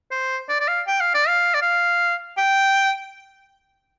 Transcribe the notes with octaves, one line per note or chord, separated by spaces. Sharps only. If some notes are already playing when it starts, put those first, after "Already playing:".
C5
D5
D5
F5
G5
F5
D5
F5
D5
F5
G5